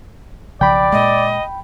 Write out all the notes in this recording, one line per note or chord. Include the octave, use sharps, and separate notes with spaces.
B1 C#3 F3 D5 G5 B5
A#2 G#3 D#5